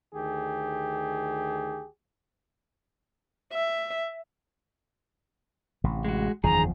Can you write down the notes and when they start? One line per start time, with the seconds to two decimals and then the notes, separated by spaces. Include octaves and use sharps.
0.13 D2 D#3 G4 G#4
3.53 E5
5.84 A1 C3
6.05 G#3 F#4
6.44 F#1 E2 D#3 F3 G#4 A#5